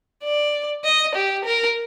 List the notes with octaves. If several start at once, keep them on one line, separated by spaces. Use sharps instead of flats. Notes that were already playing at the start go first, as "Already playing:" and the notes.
D5
D#5
G4
A#4